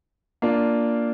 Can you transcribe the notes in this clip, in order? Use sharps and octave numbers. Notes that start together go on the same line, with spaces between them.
A#3 D4 F4